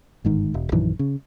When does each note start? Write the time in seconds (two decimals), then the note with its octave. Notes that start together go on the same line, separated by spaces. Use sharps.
0.25 G1 G#2 D#3
0.54 E1
0.72 A#1 F#2 D#3 E3
0.99 C#3